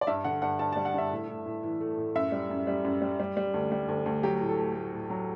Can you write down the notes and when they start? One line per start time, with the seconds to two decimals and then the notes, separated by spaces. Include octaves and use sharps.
0.01 D5
0.07 G2 E5
0.24 D3 F#5
0.42 G2 F#5
0.59 G2 A5
0.72 A5
0.77 G3
0.85 F#5
0.94 G2 E5
1.11 A2
1.29 A2
1.46 A2
1.63 E3
1.81 A3
1.97 A2
2.15 F#2 E5
2.32 G3
2.50 F#2
2.67 G3
2.85 F#2
3.02 G3
3.20 G3
3.37 G3
3.54 D2
3.72 G3
3.88 D2
4.06 D2
4.23 F#3 G4
4.41 A2
4.49 A4
4.58 A3
4.75 A3
4.93 A2
5.10 F#3